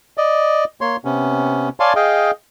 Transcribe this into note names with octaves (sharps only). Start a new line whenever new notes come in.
D5 D#5
A#3 C#5 C6
C3 B3 C#4
C#5 D5 F5 G#5 A5 C6
G#4 D#5 F5 G5